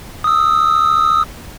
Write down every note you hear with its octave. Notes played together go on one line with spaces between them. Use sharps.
D#6 E6